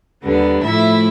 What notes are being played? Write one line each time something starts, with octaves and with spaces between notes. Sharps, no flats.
D#2 D3 G3 B3 D4
A2 F3 A3 E4 E5